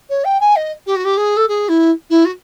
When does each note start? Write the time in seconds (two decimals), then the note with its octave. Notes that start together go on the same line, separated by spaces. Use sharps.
0.10 C#5
0.25 G5
0.40 G#5
0.56 D#5
0.87 G4
0.96 F#4
1.05 G4
1.17 G#4
1.37 A4
1.48 G#4
1.69 E4
2.10 E4
2.25 F#4